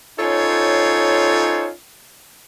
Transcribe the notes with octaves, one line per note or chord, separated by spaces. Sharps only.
C#4 D#4 F4 A4 C5 C#5